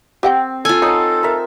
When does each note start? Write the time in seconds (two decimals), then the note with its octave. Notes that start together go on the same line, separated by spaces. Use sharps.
0.23 C4 G4 F#5 G5
0.65 F4 A4 G#5
0.82 D#4 C#5 F#5 A5
1.23 A#4 E5